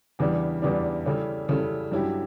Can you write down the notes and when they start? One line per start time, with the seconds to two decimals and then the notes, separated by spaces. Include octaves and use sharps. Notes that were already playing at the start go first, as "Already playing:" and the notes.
0.19 E2 C#3 E3 G3 D4
0.62 E2 C#3 E3 G3 D4
1.06 C#3 G3 C#4 E4 A4
1.49 C#3 G3 C#4 E4 A4
1.91 G2 F#3 C#4 E4 G4